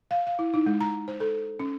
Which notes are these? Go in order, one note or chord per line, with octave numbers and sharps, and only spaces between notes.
F5
F5
E4
D#4
G#3
A#5
C5
A4
C#4